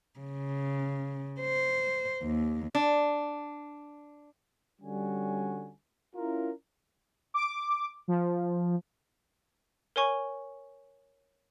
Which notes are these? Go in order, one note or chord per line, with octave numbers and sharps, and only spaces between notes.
C#3
C5
D#2
D4
D3 G3 C#4 F#4 G#5
C#4 E4 F4 A#4
D6
F3
A#4 C#5 G#5 C#6